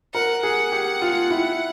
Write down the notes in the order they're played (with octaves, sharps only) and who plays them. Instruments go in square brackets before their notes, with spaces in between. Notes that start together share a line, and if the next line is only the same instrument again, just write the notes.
[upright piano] A#4 [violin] F#5
[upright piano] G#4 [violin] F#5
[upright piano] G4
F4
E4